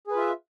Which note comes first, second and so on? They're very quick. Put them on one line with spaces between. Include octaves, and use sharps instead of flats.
G#4 B4 F4 E5